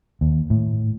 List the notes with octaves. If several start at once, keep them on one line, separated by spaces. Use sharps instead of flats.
D#2
A2